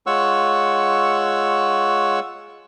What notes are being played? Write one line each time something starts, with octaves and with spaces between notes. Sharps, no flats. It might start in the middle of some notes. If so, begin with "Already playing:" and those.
G#3 F4 C#5 F#5 C#6 E6